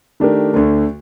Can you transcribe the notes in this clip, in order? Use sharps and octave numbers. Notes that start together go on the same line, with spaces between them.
D#3 A3 D4 G4 A#4
D2 D3 A3 D4